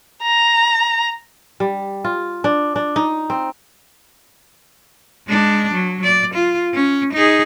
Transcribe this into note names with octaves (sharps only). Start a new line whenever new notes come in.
A#5
G3
F4
D4
D4
D#4
C4
G#3 D4
F#3
D5
F4
C#4
D#4 G#4